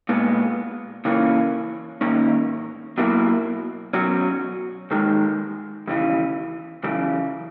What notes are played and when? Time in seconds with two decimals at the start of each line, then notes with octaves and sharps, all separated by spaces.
0.09 A#2 G#3 B3
1.05 C#3 E3 A#3 C#4
2.01 G#2 D#3 A#3 C#4
2.98 B2 F#3 A#3 E4
3.93 B2 F#3 C#4 F#4
4.91 D#2 D#3 G#3
5.88 D#2 C#3 E3
6.84 F#2 C#3 E3